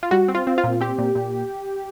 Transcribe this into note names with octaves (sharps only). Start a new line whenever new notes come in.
F4
G3 F#4
C4
F4
C4
F4
A#2
C4 G4
A#2
A#2